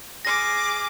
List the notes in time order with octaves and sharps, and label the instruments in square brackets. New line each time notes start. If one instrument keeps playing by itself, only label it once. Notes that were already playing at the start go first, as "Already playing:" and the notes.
[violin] G#4 D6 [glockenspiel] F6 A#6